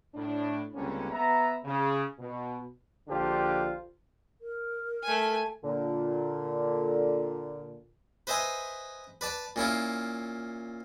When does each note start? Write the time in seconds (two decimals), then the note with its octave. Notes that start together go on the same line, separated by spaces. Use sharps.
0.15 A2 D4
0.74 C#2 D3 G3 A#3 C4 C#4
1.12 B3 E5 A#5
1.65 C#3
2.19 B2
3.08 A#1 D3 D4 F4 G4 C5
4.41 A#4
5.03 A3 G#5
5.64 A#2 D3
8.27 B4 C5 D#5 E5 G#5 C6
9.21 B4 D5 A5
9.56 A#2 C#4 E4 F4